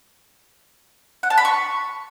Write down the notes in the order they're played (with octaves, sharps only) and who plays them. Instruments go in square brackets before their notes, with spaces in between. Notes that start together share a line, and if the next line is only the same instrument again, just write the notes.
[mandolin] F#5
A5
B5
C#6